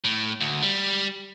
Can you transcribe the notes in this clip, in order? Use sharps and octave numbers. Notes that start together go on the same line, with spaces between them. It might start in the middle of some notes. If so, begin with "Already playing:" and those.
A2
D2
G3